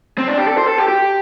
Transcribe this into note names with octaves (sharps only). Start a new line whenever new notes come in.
C4
D4
G4
A4
C5
A4
G4
G4